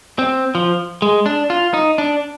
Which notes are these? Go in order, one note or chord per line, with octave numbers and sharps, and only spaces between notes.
C4
F3
G#3
D4
F4
D#4
D4